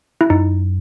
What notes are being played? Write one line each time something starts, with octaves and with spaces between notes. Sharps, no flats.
E4
F#2 D#4